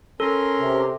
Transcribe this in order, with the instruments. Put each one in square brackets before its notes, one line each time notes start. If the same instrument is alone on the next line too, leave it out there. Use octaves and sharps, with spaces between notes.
[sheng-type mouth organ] C#4 A#4 C6 [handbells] A4
[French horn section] C3